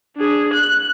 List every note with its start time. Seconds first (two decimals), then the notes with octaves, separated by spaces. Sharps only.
0.17 D4 G#4
0.54 F#6